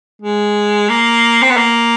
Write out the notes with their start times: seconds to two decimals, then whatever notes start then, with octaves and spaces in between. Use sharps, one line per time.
0.22 G#3
0.89 A#3
1.42 C4
1.50 B3
1.57 A#3